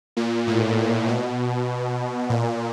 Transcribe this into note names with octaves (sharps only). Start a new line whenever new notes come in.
A#2
A2
B2
A#2